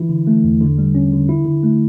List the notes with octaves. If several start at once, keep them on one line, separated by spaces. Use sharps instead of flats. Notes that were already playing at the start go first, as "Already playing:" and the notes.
Already playing: E3 E4
D3
A3
E2
D3
G3
C#4
D3
E4
D3
A3